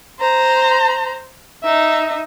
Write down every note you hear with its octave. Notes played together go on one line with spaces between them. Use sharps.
C5 A#5
D#4 E5